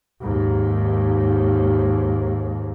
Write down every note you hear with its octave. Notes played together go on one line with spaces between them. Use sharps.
D#2 G#2